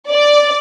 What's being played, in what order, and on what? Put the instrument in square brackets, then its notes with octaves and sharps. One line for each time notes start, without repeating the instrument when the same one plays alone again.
[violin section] D5